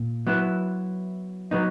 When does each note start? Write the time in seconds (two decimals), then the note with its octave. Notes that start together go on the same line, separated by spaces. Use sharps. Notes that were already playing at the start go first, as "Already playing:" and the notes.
Already playing: A#2
0.27 F#3 B3 E4
1.51 F#3 B3 D#4